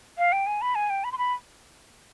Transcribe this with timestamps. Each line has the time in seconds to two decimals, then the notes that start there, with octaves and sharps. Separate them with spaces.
0.18 F5
0.32 G5
0.47 G#5
0.62 B5
0.75 G#5
0.90 G5
1.04 B5
1.12 C6
1.18 B5